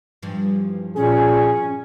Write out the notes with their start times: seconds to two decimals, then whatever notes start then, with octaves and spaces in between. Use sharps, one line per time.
0.23 G2 E3 F3
0.96 A#2 C#4 G#4